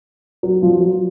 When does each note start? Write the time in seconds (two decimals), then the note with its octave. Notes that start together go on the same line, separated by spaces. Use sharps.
0.43 F#3
0.62 F3
0.81 F#3